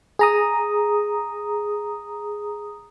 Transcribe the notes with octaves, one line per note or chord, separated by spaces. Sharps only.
G#4 A#5 D#6